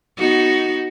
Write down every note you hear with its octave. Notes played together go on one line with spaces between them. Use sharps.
B3 D#4 F#4